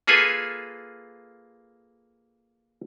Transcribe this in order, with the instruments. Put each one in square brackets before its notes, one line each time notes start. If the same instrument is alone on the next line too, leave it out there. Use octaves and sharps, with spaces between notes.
[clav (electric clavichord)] A#3 F4 G#4 A4 B4 G#5